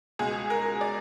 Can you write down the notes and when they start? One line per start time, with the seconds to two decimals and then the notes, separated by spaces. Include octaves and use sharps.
0.19 C#2 B2 G#3 G#4
0.50 A#4
0.81 D5